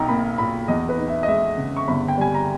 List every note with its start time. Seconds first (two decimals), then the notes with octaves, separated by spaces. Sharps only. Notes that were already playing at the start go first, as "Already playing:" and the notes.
Already playing: B1 D#4 G5 A#5
0.08 A#3 B5
0.38 A#2 B5
0.68 E2 D#5
0.89 B4
0.98 D#4
1.08 E5
1.23 D#5
1.28 G#3 E5
1.58 C#3
1.77 C#6
1.88 G1 B5
2.08 G5
2.18 G3 G#5
2.34 A#5